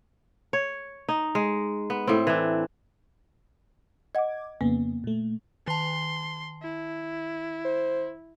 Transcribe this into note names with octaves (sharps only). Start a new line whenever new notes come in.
C#5
D#4
G#3
B3
A2 C4
E3 D4
D#5 F#5 D6 G#6
F2 C#3 A#3 B3
A#2 A3
D#3 A5 C6
E4
C5